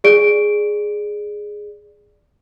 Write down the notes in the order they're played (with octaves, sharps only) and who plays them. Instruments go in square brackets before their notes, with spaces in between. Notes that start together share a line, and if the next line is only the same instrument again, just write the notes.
[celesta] G#4 D5 D7